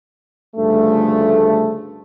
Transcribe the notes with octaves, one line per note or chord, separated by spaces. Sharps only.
D2 G2 C#3 F3 A3